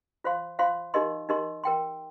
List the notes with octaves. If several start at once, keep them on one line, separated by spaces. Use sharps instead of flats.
F4 C5 F5 C6
F4 C5 F5 C6
D#4 G4 A#4 D#5 C6
D#4 G4 A#4 D#5 C6
A#4 G5 C6